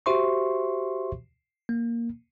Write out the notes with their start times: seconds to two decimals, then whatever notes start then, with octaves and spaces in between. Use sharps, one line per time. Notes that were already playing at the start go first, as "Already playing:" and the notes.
0.06 F#4 G4 C5 E5 C6 C#6
1.69 A#3